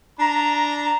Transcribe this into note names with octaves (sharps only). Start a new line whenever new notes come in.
D4 A#5